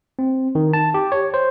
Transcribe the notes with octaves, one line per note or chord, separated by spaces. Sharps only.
C4
D#3
A5
G4
C#5
C5